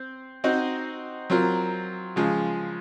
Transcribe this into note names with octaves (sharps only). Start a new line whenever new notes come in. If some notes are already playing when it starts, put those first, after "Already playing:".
Already playing: C4 C5
C4 D#4 F#4 C5 D#5
F#3 C4 F4 A#4
C#3 F3 G#3